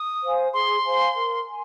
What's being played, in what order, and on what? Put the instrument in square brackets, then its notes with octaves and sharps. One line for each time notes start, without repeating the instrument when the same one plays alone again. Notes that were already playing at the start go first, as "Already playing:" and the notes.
Already playing: [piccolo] D#6
[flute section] C5 F5 G#5
[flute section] G#4 [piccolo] C6
[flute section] C5 F5 G#5
A#4
G#5 C6